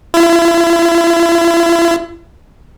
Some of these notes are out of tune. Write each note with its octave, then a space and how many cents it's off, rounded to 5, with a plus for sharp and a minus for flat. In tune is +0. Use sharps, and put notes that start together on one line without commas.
E4 +40